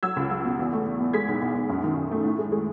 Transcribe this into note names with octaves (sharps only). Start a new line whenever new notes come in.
F#3 E6 G#6
C#2
F#3
B2
E2
A3
E2
E2
G#3 G#6 B6
B1
B1
B1
F#2
D#3
F#2
A3
A2
G#3
G#3